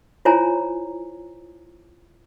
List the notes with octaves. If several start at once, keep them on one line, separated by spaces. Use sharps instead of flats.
E4 F4 C5 C#5 G#5 A#5